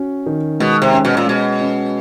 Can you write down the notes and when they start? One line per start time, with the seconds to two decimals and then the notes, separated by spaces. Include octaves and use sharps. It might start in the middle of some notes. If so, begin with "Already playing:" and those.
Already playing: C#4 F#4
0.26 D#3
0.60 B2 G#3
0.82 C3
0.93 C#4
1.05 B2
1.17 A#2
1.26 B2 G#3
1.60 C#4